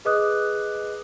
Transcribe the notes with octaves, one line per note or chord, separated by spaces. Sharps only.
G#4 B4 D#5 D6 D#6 F#6